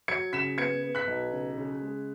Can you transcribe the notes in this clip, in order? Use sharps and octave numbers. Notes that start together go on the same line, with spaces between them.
F#3 G#6 C#7
C#3 B6 E7
B3 G#6 C#7
B3
F#6 B6
B1
C#3
C#3
G#3